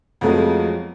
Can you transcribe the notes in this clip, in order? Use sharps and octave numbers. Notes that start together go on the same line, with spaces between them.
F2 F3 F#3 G#3 A3 B3